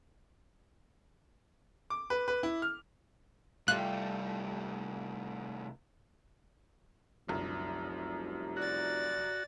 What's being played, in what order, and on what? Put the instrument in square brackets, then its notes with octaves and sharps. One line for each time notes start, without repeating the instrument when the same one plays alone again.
[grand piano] D6
B4
B4
E4
F6
[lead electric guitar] C2 A3 [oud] G3 E4 F4 [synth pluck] F#6
[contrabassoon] F1 [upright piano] C2 F#2 D3
[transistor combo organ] F#4 [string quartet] D5 A6